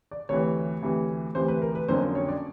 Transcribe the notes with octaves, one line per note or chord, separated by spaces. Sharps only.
D5
D2 C3 E3 C#5
D2 C3 E3
D2 C3 E3 C5
B4
A#4
B4
F2 D3 F#3 A#3 C#4 C5
C#5
D5